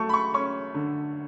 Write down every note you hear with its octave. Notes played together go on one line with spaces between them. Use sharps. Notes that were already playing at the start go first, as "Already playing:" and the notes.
Already playing: F#3 A3 A5 C#6
B5
C#6
C#4 C#6
D3